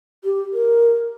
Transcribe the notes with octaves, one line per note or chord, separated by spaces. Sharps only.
G4
A#4